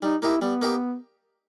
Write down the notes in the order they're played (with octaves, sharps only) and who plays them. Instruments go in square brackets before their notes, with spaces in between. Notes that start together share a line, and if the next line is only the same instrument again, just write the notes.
[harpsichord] G3 [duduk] D#4
[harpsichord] A#3 D#4 G4 [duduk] E4
[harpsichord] G3 [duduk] B3
[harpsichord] A#3 D#4 G4